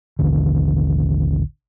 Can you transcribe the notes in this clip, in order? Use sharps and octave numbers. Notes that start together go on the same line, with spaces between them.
A1 D#2 D3